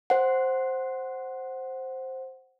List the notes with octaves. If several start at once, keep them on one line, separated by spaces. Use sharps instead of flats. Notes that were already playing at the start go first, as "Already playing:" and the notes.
C5 F#5